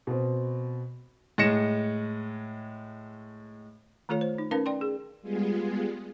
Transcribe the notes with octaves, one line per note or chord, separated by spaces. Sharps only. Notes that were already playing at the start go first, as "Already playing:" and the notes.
B2 C4
A2 G#3 A#6 C#7 E7
D#3 A3 F4 A4 C#5
C5
D#4
C#4 D#4 A#4 B4 F5 A5
D5 G5 C6
G#4
G3 G#3 B3 F4 G#4